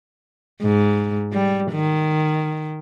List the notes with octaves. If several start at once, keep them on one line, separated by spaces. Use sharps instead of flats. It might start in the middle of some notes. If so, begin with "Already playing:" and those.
G#2
G3
D#3